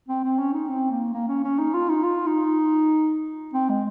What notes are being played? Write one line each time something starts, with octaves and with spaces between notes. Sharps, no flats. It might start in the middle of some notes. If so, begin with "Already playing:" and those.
C4
C4
C#4
D#4
C4
A#3
A#3
C#4
C#4
D#4
F4
D#4
F4
D#4
C4
G#3